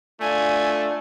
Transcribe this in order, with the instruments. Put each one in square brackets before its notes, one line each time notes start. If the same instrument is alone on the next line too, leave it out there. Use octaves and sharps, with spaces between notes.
[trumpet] A3 [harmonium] D4 F4 D5 [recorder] G#5